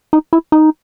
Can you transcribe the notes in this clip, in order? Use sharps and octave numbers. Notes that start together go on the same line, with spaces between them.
D#4
E4
D#4